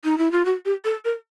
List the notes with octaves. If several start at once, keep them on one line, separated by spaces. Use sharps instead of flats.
D#4
E4
F4
F#4
G4
A4
A#4